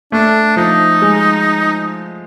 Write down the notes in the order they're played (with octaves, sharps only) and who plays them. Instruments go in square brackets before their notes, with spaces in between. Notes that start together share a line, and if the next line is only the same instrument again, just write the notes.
[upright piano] A3 [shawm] D4
[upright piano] F3 [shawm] D#4
[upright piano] G#3